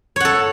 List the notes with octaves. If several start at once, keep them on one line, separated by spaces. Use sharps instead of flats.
A4 C#5 F#5